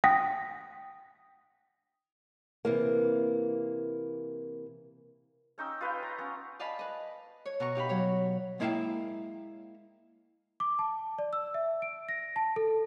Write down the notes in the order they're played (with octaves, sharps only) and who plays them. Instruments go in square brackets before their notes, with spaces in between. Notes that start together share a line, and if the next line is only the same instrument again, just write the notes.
[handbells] F#5 G5 D#6 A#6 B6
[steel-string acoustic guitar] C3 E3 A#3
[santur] C#4 D#4 G5 E6
F4 B4 C#5 G5
A#5
B3 C#4
[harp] D5 D#5 F5 G#5 A5 B5
B4 D#5
C#5
B2 A#5 C#6
D#4 G4 F5 B5
F#3 C#5
[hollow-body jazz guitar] G#3 A#3 E4 E5 F5 G5
[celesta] D6
A5
D5
E6
E5
D7
A#6
A5
A4